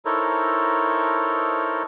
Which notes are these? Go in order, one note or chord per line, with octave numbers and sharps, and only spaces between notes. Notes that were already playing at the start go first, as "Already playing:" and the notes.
D#4 E4 A4 A#4 C5 C#5